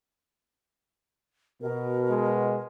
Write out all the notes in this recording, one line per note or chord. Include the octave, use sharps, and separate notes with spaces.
B2 A#4
G#3